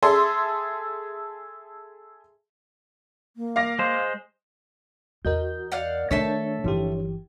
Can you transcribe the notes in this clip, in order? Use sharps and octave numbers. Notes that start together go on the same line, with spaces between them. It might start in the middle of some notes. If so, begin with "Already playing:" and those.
G#4 A4 E5 C6
A#3
F5 D6 A#6
G#3 C5
E2 F#4 A#4 D#5 G6
D5 F5 F#5
D#3 A3 D4 A4 C#5 E5 A5
G1 E3 F3 G4